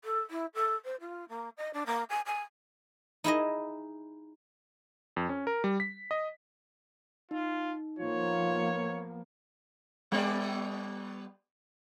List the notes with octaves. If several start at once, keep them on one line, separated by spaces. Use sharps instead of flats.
A4
E4
A4
C5
F4
A#3
D#5
D4
A#3
G#5
G#5
D#4 E4 G#4 D#5
F2
C#4
A#4
G3
B6
D#5
D#4 F4
F3 A#3 B3 F4 C#5
G3 B3 D5